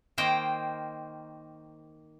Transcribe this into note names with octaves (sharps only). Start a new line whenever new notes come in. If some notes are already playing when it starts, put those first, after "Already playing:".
D#3 A#3 C5 G5